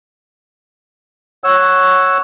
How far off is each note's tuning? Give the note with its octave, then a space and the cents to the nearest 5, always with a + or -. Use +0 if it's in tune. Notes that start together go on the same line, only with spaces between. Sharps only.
C#5 -5 F#5 +0 E6 +0